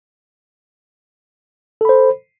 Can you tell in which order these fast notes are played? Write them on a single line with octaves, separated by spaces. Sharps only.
A4 B5 C5